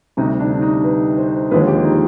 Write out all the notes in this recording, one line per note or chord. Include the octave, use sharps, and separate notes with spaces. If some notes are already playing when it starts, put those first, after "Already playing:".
D2 C3 G3 D#4
D4
D4
D#4
B4
C5
D#2 D3 F3 G#3 B4
G4
D#4